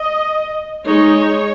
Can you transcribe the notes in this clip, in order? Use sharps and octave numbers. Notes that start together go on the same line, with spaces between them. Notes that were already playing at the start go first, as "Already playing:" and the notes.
Already playing: D#5
G#3 D#4 C#5